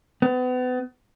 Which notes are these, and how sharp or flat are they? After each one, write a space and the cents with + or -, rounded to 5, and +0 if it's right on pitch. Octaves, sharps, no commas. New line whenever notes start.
B3 +35